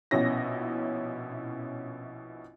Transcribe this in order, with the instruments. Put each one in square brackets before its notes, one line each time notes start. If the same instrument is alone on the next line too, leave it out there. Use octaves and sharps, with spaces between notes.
[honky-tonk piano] A#1 B2 C#4 E4 A#6